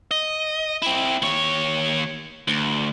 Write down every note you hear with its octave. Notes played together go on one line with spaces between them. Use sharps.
D#5
C4 E4
D#2 C#5
D2